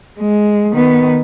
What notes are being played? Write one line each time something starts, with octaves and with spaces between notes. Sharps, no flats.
G#3
D#3 B3